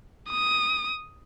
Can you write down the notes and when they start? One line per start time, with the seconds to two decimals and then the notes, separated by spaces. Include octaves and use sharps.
0.30 D#6